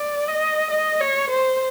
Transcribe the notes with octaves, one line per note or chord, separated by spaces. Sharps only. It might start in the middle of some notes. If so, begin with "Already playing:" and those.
Already playing: D5
D#5
D#5
C#5
C5